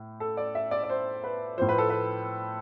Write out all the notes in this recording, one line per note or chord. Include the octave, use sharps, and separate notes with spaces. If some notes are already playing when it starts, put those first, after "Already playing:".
Already playing: A2
A4
D5
E5
D5
D5
C5
B4
A2 F3 C5
B4
A4
B4